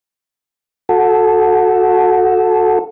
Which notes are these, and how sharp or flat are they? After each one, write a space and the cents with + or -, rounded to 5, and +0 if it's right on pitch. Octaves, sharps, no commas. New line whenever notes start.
F#4 -15 A4 -5